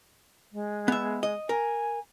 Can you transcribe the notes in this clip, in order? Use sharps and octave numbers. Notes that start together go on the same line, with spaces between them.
G#3
B3 E5
D#5
A#4 G#5